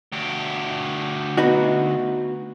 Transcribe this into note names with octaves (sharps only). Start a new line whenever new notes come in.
D2 G4
B3 D#4 F#4